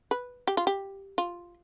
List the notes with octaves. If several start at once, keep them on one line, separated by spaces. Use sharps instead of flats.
B4
G4
F4
G4
F4